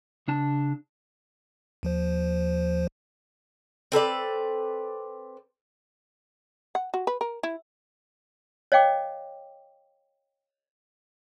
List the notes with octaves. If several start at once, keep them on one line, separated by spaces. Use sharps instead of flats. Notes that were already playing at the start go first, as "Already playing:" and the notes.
C#3 D4 A5
D#2 F3 C5
C4 A4 B4 D5
F#5
F#4
B4
A#4
E4
C#5 D#5 F5 G5 D6